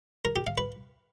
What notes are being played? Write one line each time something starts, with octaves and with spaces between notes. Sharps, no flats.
A#4
G4
F5
B4